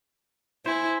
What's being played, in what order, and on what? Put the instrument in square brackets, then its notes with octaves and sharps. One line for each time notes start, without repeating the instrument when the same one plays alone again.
[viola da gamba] E4 [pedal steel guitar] C5 G#5